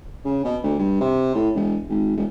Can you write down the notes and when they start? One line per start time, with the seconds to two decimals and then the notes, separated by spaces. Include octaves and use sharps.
0.25 C#3
0.45 B2
0.63 D2
0.79 G2
1.01 C3
1.35 A2
1.55 E1
1.90 G#1
2.17 E1